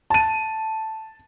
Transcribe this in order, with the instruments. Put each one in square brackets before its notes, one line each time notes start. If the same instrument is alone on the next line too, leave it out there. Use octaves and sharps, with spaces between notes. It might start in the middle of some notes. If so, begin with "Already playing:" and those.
[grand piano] A5 D#7